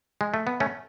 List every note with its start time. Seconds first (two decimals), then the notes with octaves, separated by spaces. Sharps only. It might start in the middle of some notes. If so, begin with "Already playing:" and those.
0.21 G#3
0.34 A3
0.47 B3
0.60 A3 C#4